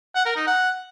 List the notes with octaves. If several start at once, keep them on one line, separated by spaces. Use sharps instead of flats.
F#5
A#4
D#4
F#5